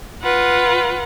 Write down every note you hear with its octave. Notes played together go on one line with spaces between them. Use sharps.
F4 B4 F#5